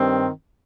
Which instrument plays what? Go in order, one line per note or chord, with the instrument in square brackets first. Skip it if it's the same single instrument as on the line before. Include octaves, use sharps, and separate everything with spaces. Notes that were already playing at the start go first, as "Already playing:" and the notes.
Already playing: [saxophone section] G2 D#3 C4